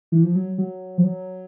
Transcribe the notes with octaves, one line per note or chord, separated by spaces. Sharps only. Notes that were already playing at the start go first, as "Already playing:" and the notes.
E3
F3
F#3
F#3
F3
F#3